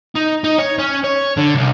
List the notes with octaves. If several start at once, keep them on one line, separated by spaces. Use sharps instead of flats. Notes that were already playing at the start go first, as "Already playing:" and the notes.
D#4
D#4
C#5
C#4
C#5
D3
C2